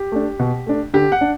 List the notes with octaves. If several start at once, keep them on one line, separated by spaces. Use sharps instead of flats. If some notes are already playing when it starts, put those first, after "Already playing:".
Already playing: G4
A3 D4
B2
A3 D4
D3 G4
F#5
D4